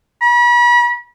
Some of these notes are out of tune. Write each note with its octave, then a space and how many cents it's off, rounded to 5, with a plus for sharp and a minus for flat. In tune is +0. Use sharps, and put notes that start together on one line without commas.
B5 -40